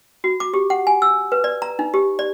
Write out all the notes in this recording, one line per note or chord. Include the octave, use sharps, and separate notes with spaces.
F#4
D6
G4
F#5
G#5
E6
B4
D5
A#5
D#4
G4
D5